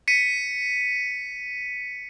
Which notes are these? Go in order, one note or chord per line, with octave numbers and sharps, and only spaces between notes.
B6 C#7 D#7